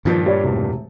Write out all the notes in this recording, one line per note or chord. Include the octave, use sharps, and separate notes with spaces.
G2 A#2 D#3 F3
G3 C#5 D5
E1 A2 C3